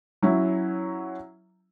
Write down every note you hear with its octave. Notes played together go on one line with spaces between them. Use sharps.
F#3 C#4 E4